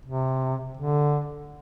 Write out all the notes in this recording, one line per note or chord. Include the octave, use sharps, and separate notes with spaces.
C3
D3